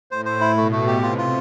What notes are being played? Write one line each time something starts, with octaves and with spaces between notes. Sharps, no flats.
A2 C5
C5
E4
B2 A3
A3
G4
C3 F4
F4